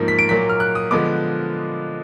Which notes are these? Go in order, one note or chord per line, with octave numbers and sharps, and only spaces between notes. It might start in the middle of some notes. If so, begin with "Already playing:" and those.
Already playing: G#2 F3 A#3
B6
D7
A#2 F#3 A#3 B6
F6
F#6
D#6
D3 F3 G#3 B3 D6